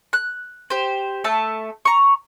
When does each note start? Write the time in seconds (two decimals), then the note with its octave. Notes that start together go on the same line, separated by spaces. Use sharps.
0.13 F#6
0.70 G4 C5
1.24 A3 E5 A5
1.85 A#5 C#6